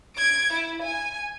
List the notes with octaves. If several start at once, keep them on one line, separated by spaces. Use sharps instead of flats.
G#6 D7
E4
G#5